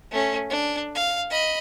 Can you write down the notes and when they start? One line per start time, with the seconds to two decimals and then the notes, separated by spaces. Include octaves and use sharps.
0.11 A3 C#4
0.50 D4
0.95 F5
1.30 D#5 B5